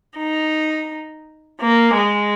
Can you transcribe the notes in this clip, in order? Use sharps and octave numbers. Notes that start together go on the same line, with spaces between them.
D#4
A#3
G#3